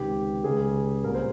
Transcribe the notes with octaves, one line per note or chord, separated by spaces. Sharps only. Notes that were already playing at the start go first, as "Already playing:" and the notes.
Already playing: C#2 C3 D#3 G4
C#2 C#3 G#4
C2 A#2 A#4
C5